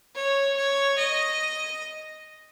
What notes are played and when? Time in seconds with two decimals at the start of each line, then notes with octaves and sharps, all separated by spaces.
0.16 C#5
0.57 C#5
0.98 D#5